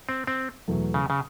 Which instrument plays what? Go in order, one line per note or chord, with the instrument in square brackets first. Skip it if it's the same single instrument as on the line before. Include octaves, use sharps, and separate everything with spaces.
[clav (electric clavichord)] C4
C4
[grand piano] E2 B2 F#3 A3
[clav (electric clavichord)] C#3
C#3